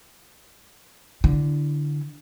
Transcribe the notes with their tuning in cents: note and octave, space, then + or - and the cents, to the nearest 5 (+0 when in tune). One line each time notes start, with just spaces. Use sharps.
D3 +0 E4 +20